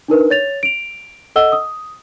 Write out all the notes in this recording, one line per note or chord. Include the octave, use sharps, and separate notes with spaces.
D4 D#4 A#4 B4
C#5 A6 F7
D7 F7
A4 D#5 F#5 E6 G7
D#6